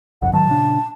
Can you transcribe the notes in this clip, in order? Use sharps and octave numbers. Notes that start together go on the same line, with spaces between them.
G1 C2 F2 F#5
G#2 D#3 F#3 A5
A#2 C#3 D4